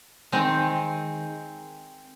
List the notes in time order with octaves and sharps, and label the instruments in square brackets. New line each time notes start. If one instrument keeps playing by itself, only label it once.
[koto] D#3 G#3 C4